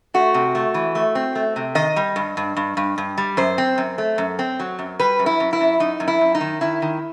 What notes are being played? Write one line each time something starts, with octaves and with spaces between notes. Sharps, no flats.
A3 F#4
C3
A3
E3
A3
C4
A3
C3
D#3 D#5
G3
G2
G2
G2
G2
G2
G3
F#2 C5
C4
F#2
A3
F#2
C4
F#3
F#2
G3 B4
F#2
E4
F#2
E4
F#2
F#2 D#4
F#2
E4
F#2
D#4
D#3
D#3 E4
D#3